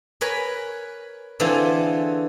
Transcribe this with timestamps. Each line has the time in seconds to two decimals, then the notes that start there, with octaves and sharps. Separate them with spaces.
0.21 A#4 B4 C#5 G#5 B5
1.40 D3 E3 A3 C4 F4 G#4